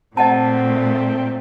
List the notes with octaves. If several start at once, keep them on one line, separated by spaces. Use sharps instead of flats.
A#2 A3 C4 D#5 F#5 A5